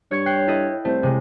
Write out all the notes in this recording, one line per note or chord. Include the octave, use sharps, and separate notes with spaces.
G2 C#5 G#6 C#7
C#5 G5 F#6 C7
E4 A4 D#5
C2 A3 C5
C3 G#3